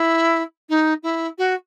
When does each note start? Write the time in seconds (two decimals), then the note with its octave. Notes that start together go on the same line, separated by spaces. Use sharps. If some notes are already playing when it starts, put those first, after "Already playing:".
Already playing: E4
0.69 D#4
1.03 E4
1.38 F#4